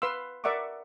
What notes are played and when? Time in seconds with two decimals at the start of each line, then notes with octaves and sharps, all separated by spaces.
0.02 B4 F5 C6 E6
0.44 A#4 D5 E5 F#5 C#6 D6